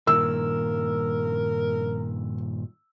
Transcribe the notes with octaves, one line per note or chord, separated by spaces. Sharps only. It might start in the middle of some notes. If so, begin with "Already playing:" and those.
G2 A#2 D#3 A#4 E6